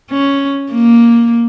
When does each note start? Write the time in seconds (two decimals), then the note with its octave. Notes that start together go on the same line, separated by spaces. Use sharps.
0.11 C#4
0.72 A#3